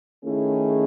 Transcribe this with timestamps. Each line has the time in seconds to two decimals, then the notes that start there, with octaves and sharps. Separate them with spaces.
0.23 D#3 A3 C#4 E4 G#4